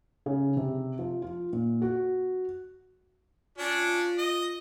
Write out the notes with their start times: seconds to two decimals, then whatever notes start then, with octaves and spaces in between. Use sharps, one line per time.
0.26 C#3
0.57 C3
0.99 F3
1.22 F4
1.53 A#2
1.82 F#4
3.58 C#4 D4 F4
4.18 D#5